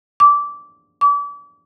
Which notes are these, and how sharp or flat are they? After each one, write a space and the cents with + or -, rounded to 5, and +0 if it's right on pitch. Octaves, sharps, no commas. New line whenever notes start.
D6 -15
D6 -35